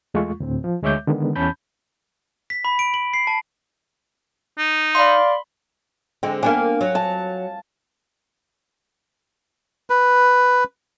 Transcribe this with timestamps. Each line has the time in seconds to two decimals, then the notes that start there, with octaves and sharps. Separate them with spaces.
0.14 E2 G#3 A3 F4 C#6
0.40 D2 A2 C4
0.64 F3
0.82 D2 G#3 C#5 E5 D6 G6
1.07 D3 D#3 G#3 B3
1.35 E2 C#4 A5 B5 G6
2.50 B6
2.65 B5
2.79 D7
2.94 F#7
3.14 C7
3.27 A5
4.58 D#4
4.95 D5 F5 B5 C6
6.23 D3 G#3 C4 G5
6.43 A#3 B3 D4 F5 G#5
6.81 F#3
6.95 A5
9.90 B4